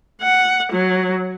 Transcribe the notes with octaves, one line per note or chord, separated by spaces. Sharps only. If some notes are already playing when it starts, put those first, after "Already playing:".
F#5
F#3